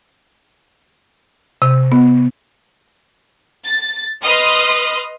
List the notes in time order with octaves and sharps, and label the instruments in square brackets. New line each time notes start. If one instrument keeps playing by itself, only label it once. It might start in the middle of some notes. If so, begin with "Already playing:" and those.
[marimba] C3
B3
[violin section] A6
B4 D#5 C6 D#6 F6